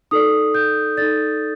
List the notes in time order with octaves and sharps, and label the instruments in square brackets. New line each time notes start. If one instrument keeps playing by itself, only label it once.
[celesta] D#4 A4 D5 D#6
G6
D#4 A4 D5 A6